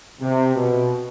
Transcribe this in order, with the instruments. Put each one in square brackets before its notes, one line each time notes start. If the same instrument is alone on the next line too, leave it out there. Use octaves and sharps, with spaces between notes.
[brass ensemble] C3
B2